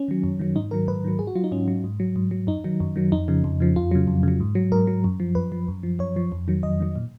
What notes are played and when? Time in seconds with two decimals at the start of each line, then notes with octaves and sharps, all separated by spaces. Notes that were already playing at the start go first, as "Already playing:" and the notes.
Already playing: C#4
0.08 D#3 F#3
0.24 F#2
0.39 D#3 F#3
0.56 G#2 D#4
0.71 D#3 F#3 A#4
0.88 G#2 B4
1.04 D#3 F#3
1.19 G#2 G#4
1.27 F#4
1.35 F#3 F4
1.44 D#4
1.52 G#2 C#4
1.68 F#3
1.84 G#2
2.00 F#3
2.16 G#2
2.31 F#3
2.47 F#2 D#4
2.64 D#3 F#3
2.80 F#2
2.96 D#3 F#3
3.12 F2 D#4
3.28 C#3 F3
3.44 F2
3.60 C#3 F3
3.76 F2 F4
3.91 C#3 F#3
4.07 F2
4.23 C#3 F#3
4.40 G#2
4.55 F#3
4.72 G#2 A#4
4.87 F#3
5.04 F#2
5.20 F3
5.35 F#2 B4
5.52 F3
5.68 F#2
5.83 F3
5.99 F#2 C#5
6.16 F3
6.32 F2
6.48 D#3 F#3
6.63 F2 D#5
6.80 D#3 F#3
6.96 A#2